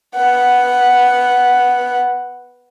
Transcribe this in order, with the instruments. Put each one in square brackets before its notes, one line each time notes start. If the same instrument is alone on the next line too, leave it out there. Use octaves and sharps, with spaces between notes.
[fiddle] B3 F#5